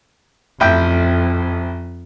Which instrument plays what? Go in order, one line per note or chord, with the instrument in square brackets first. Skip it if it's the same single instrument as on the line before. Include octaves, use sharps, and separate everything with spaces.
[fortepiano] A1 E4 G5 [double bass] F2